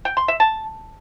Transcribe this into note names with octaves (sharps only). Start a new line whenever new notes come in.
G5
C6
E5
A5